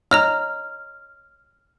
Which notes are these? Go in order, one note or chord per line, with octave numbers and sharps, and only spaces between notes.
C#5 D#5 A#5 F6